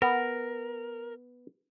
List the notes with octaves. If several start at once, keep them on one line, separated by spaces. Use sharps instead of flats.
B3 A#4